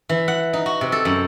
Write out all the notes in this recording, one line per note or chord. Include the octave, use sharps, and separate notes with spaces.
E3
F#5
D#4
F#4
C3
A4
F#2